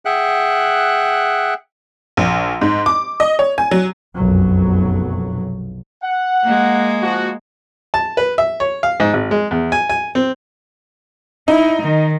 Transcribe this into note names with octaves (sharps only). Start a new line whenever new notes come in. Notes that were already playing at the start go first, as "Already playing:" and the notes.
G#4 E5 F#5 G5 F#6
A#1
G#2
D6
D#5
C#5
G#5
F#3
F1 B1 F#2 F#3
F#5
G#3 A#3
F3 F#4
A5
B4
E5
C#5
F5
G#2
G#1
G#3
E2
G#5
G#5
C4
D#4 E4
D#3